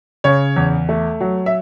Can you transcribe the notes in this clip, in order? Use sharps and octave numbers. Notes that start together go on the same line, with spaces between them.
C#3 C#5
E2
A3
F#3
E5